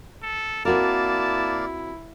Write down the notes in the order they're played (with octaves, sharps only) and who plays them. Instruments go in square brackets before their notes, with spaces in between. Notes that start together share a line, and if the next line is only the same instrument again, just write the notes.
[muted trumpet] A4
[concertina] A#3 D5 F5 [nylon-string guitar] C4 F#4 A#4 [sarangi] E4 [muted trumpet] A5